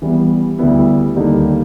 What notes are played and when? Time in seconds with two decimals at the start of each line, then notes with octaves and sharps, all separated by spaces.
0.02 E3 G3 B3
0.59 D2 D3 G3 B3 E4
1.16 D#2 D3 G3 A#3 D#4